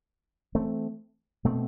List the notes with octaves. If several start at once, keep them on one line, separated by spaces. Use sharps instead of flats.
E3 A3 C4
B2 A3 C4